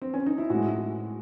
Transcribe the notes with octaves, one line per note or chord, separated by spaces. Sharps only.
C4
C#4
D#4
E4
A2 G#3 F#4